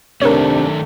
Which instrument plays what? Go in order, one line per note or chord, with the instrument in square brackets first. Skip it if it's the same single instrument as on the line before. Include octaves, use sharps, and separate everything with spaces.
[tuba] C3 [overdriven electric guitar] D#3 A3 [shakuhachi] D4 [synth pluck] A#4 C#5